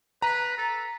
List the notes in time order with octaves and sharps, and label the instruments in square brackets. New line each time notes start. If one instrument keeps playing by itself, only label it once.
[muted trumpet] B4 [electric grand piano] A#5
[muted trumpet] A4